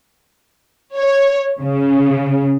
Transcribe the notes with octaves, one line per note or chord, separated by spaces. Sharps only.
C#5
C#3